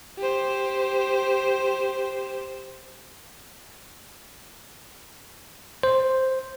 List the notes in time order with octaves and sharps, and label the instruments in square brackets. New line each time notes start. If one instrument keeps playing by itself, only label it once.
[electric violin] G4 C5
[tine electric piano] C5